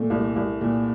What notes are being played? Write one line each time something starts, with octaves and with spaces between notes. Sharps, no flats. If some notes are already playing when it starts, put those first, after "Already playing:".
Already playing: A#2 A3
C2
C2
A#2